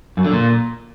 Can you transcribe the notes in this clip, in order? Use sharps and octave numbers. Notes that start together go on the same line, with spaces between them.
F#2
D3
A#2